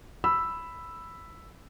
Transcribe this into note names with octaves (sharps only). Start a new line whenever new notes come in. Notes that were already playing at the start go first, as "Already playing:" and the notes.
B5 E6